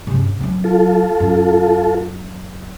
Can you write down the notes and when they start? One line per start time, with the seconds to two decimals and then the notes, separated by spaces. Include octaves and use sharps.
0.07 G2 C#3
0.40 F#3 C4
0.64 F4 A4
1.20 F#2